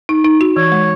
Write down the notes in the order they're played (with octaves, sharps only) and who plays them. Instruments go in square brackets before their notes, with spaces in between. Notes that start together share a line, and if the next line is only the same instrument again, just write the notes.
[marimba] D#4
D#4
F#4
[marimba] E3 [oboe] C#5
[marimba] G#3